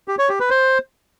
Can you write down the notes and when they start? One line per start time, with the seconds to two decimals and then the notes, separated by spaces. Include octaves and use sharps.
0.08 G4
0.19 C#5
0.29 G4
0.40 B4
0.50 C5